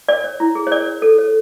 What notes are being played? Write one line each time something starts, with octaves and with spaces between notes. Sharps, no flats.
A#4 D5
C#5
E4
G#4
C#5
A#4 D5
C#5
A4
C#5